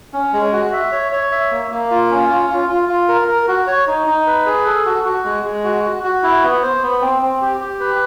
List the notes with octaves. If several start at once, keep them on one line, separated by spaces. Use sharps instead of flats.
C#4
G#3
F#4
E5
C#5
C#5
E5
A#3
A#3
F4
C#4
F4
F4
F4
F4
A#4
A#4
F#4
C#5
D#4
D#4
B4
G#4
A4
F#4
F#4
G#3
G#3
F#4
F#4
F#4
E4
B3
C5
B3
C4
C4
G4
G4
B4